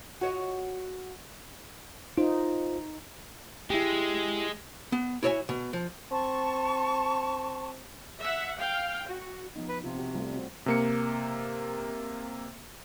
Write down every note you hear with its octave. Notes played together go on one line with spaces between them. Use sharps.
F#4 C#5 D#5
D#4 F4 C5
G#3 E4 G4
B3
E4 F#4 C#5 D#5 E5 G#5
B2
F3
C4 A5 C#6
E5 F#5
F5 G5
F#4
F3 B3 D#4
B4
C3 F4
C4 F#4 G4
G3 A3 F4
C4 F#4
C3 A#3 C#7